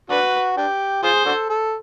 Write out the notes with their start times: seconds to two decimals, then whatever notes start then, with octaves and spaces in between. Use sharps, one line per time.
0.10 D4 F#4 B4
0.57 D4 G4
1.03 F4 G#4 C5
1.26 D4 F#4 A4
1.49 A4